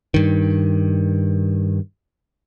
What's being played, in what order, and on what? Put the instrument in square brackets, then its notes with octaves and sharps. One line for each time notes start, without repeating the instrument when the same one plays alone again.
[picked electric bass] G2 D#3